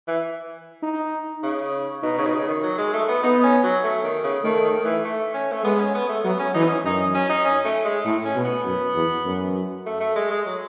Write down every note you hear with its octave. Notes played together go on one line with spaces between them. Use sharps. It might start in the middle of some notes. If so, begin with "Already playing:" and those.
E3
D#4
C#3
B2 D#4
C#3
B2
C#3
D#3
F#3
G#3
A3
B3
B3 D#4
C#4
F#3
A3
D#3
C#3
D#3 A3
D#3
E3
A3
C#4
A3
G#3 B3
C#4
B3
A3
F#3 B3
C#4
E3 D#4
B3
C#4
F#2 D#4
C#4
D#4
C#4
A3
G#3
A2 A3
C#4
B2
B3
F#2
E2
F#2
A3
A3
G#3
G#3
F#3